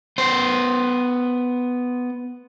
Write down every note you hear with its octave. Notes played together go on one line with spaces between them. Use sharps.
B3 C5